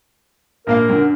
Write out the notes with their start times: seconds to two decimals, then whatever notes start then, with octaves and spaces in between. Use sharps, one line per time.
0.67 A#1 A#3 A#4 F5
0.89 F#2 D3